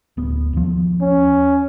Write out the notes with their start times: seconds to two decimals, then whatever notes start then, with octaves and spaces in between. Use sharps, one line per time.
0.17 D1 B3
0.53 D#2 F3
1.01 C#4